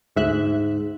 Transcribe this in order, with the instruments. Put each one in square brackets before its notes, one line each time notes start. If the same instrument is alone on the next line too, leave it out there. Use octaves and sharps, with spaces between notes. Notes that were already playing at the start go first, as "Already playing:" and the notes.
[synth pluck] D2 E5 F#6 [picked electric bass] G#2